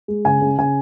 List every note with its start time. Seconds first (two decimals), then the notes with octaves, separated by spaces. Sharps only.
0.08 G#3
0.25 C#3 G#5
0.41 C#3
0.58 C#3 G#5